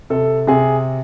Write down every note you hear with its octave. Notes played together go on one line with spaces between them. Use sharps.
C3 A4
C3 G#4